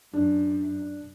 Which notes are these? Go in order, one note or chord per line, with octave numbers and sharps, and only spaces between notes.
F#2 D4